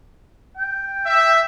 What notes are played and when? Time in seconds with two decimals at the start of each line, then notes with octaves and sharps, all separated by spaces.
0.56 G5
1.05 E5